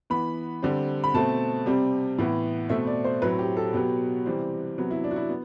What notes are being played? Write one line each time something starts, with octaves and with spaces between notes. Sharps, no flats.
E3 B3 B5
D3 G3 C4
B5
B2 A3 C4 A5
C3 G3 C4
A2 E3 B3
B2 A3 C4 E5
D5
C5
A2 F#3 C4 B4
G4
A4
B2 F#3 B3 G4
C3 E3 G3 C4
C3 F#3 B3
E4
D4
F#4
E4
B3